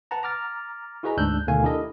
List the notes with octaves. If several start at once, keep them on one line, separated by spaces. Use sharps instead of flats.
B4 F#5 A5 A#5
A#5 D6 F6 A6
E4 F#4 G#4 B4 D#5 A#5
D2 G#2 D4 E6 F#6 G6
D2 B2 D#3 A3 F5 G#5
D4 E4 G4 A4 A#4 D#5